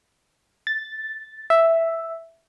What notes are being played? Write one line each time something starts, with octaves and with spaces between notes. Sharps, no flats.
A6
E5